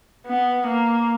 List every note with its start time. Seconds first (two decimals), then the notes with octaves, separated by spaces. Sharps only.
0.26 B3
0.67 A#3